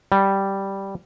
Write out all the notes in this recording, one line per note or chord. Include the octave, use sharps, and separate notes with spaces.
G3